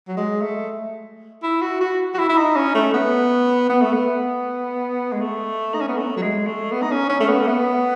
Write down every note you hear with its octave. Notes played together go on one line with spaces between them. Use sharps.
F#3
G#3
A3
E4
F#4
F#4
F#4
E4
E4
D#4
C#4
A3
B3
B3
A3
B3
G#3
A3
D#4
C#4
B3
A3
F#3
G#3
A3
B3
D#4
C#4
C#4
A3
B3
A3
B3